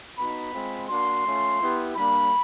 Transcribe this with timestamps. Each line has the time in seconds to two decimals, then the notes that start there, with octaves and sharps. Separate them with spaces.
0.18 B3 D#4 F#4 B5
0.54 G#3 C4 F4
0.89 A#3 D4 F#4 C6
1.26 A3 C#4 F4
1.60 B3 E4 G4
1.95 G3 A#3 D4 B5